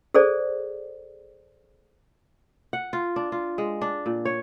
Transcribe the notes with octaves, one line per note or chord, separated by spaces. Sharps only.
G#4 A4 C5 D5
F#5
F4
D4
F4
G#3
D4
A#2
C#5